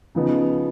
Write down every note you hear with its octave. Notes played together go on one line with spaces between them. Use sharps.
C#3 F3 B3 D#4